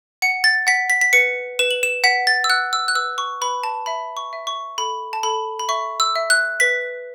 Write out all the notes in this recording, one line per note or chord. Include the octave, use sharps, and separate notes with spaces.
F#5 C#7
A6
F#5 B6
B6
B6
B4 C#7
B4 E7
F#7
E7
F#5 B6
A6
E6
F#5 F#6
E6
F#6
B4 E6
C#6
B4 B5
A5
E5 B5
C#6
E5
C#6
A4 B5
A5
A4 B5
B5
E5 C#6
E6
E5
F#6
B4 B6